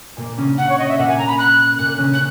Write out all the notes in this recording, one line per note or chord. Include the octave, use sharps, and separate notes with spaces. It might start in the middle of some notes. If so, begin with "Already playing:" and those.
A#2 A#3
C#3 C#4
F#5
C#5
D#5
E5
A#2 A#3 F#5
G#5
A#5
B5
F#6
A#2 A#3 F#6
C#3 C#4
F#6